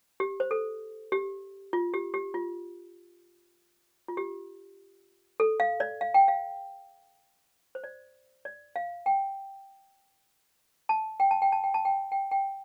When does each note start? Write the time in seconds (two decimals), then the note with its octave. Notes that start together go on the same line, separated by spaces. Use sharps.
0.20 G4
0.40 C5
0.51 A4
1.12 G4
1.73 F4
1.94 G4
2.14 G4
2.34 F4
4.08 F4
4.17 G4
5.40 A4
5.60 F5
5.80 D5
6.01 F5
6.14 G5
6.28 F5
7.75 C5
7.84 D5
8.45 D5
8.76 F5
9.06 G5
10.89 A5
11.20 G5
11.31 A5
11.42 G5
11.52 A5
11.64 G5
11.74 A5
11.85 G5
12.12 G5
12.31 G5